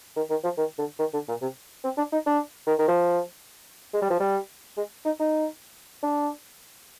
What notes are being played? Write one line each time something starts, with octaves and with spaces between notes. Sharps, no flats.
D#3
D#3
F3
D#3
D3
D#3
D3
A#2
C3
C4
D4
D#4
D4
D#3
D#3
F3
G#3
G3
F3
G3
G#3
D#4
D#4
D4